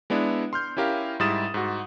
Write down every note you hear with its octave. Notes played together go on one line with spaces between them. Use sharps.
G#3 B3 D4 E4
C6 F6 G6
C#4 E4 G4 A#4 F5
G#2 G3 E4 D#6 A6 E7
G#2 F#4